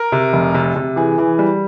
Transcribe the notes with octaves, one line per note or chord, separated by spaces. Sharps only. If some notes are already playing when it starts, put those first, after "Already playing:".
Already playing: A#4
C3
F1
C3
C3
E3 G#4
E3
G3